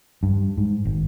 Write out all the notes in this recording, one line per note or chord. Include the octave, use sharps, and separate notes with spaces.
G2
G#2
G#1